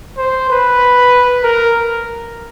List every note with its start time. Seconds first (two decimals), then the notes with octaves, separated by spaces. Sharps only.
0.18 C5
0.50 B4
1.43 A#4